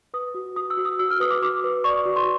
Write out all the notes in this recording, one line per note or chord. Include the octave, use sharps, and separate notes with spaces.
B4 D#6
F#4
F#4 D#6
E6
F#4
D#6
F#4 E6
F6
B4 D#6
D6
F#4 D6
B4
D5 C#6
F#4
C6